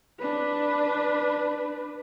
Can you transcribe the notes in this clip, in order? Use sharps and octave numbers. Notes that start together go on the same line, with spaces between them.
D4 B4